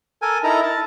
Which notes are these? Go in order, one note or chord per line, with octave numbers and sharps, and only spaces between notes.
A4 A#4 G#5
D#4 E4 A4 A#4 A#5
A5